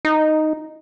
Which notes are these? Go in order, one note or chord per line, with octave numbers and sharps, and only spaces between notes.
D#4